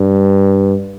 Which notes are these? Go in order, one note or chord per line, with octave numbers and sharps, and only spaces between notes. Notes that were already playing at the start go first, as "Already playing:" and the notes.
Already playing: G2